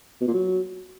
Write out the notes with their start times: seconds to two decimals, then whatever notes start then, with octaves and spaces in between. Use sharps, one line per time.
0.21 B2
0.27 A#2
0.34 F#3